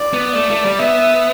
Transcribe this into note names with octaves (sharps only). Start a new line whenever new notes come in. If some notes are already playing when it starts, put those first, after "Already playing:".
Already playing: D5
B3
A3 D5
A3
G3
B3 E5